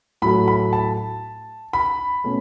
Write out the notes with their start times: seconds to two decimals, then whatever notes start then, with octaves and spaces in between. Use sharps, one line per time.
0.22 A2 F#3 A3 B5
0.48 B5
0.73 A5
1.73 B5
2.24 B2 A3 C#4